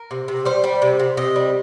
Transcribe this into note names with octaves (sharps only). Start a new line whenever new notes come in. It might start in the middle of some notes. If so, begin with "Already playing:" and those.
Already playing: A#4
C3
C3
G3 C5
G3
C3
C3
C3 D#5
G3